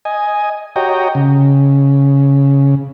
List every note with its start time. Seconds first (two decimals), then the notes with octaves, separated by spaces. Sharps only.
0.05 D#5 G#5
0.76 F#4 G4 C#5 D#5 G5 A#5
1.15 C#3